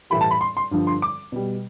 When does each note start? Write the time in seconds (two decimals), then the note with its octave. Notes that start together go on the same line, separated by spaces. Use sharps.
0.10 A2 E3 G3 B5
0.21 A5
0.31 B5
0.41 C6
0.57 C6
0.71 G2 D3 F3
0.87 C6
1.02 D6
1.32 B2 G3